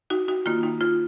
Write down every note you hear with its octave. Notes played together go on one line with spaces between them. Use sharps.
D#4 F#4
D#4 F#4
D#3 A#3 F4
D#4
F4